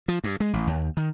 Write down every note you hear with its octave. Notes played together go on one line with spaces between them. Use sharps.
F3
G2
G#3
A1
D#2
D#3